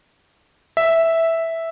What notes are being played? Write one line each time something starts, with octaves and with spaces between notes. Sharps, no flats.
E5